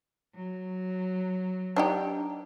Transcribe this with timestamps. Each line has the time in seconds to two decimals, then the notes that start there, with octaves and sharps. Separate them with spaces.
0.34 F#3
1.76 D4 D#4 G4